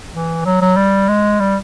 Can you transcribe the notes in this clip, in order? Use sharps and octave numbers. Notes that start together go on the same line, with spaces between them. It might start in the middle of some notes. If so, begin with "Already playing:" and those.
E3
F#3
F#3
G3
G#3
G3